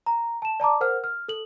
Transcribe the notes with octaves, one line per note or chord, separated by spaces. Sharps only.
A#5
A5 E7
D5 A5 A#5 D6
A#4 C5 F#5 F6
F6
A4 F#7